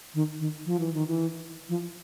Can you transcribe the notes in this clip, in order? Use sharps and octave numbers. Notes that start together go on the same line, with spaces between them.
D#3
D#3
F3
E3
D#3
E3
F3